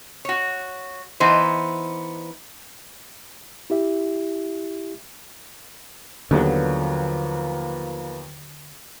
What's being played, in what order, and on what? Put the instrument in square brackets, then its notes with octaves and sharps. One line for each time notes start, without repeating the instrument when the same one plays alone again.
[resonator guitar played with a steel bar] F#4 C#5
E3 B3 D#4 C5
[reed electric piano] E4 G4 E5
[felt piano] D#2 B3 F#4 [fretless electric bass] D3 F#3 [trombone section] F3 A#3 B4